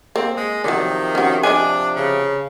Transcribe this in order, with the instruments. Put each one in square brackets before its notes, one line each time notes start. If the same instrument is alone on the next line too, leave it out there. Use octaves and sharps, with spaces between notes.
[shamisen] A#3 [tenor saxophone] C4
[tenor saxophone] G#3
[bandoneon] C3 F3 [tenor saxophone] D#3 [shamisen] F#3 D5
[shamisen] C#4 F#4
[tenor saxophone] D4 [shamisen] D#5 G#5
[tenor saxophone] C#3